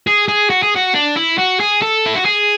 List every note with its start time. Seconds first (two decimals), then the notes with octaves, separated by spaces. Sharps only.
0.07 G#4
0.28 G#4
0.50 F#4
0.63 G#4
0.76 F#4
0.94 D4
1.16 E4
1.38 F#4
1.60 G#4
1.82 A4
2.06 E4
2.16 F#4
2.26 G#4